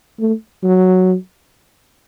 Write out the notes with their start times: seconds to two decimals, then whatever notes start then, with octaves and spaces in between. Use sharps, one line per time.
0.20 A3
0.63 F#3